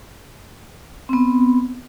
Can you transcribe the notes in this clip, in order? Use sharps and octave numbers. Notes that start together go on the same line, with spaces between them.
B3 C4